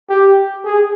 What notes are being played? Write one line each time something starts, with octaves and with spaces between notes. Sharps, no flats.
G4
G#4